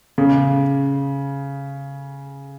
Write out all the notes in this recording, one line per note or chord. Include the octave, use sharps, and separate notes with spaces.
C#3